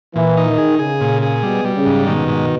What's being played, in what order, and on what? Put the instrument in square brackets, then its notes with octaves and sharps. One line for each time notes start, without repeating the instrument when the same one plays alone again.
[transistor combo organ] A#2 [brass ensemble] E3
[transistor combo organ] D#4
[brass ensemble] D#3
[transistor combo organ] G#4
[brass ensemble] C#3 [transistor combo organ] G#4
[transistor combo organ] A#2
G#4
[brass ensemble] B2 [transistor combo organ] G3
[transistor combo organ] G3
[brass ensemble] C#3
[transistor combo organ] G#2
[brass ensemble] B2 [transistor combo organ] D#3
[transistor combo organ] G#2